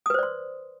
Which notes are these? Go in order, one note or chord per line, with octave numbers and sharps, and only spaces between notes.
B4 C5 D5 C6 D#6